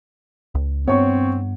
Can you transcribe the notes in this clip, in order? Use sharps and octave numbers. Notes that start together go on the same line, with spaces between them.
C#2
G2 B3 C4 C#5 C#6